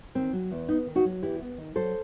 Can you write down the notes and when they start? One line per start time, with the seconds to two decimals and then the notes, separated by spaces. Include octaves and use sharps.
0.15 D#3 C4
0.33 F#3
0.51 E2
0.69 B3 D#4
0.87 D#3
0.95 D#4 F#4
1.05 F#3
1.22 E2 E4 G4
1.40 B3
1.58 D#3
1.76 F#3 A4 C5